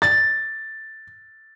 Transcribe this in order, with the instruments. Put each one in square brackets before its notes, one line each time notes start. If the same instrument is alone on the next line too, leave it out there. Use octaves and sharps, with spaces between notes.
[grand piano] A6